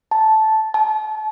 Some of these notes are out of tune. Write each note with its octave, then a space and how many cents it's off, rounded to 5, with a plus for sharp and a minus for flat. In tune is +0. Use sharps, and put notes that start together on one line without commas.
A5 -10
A5 -35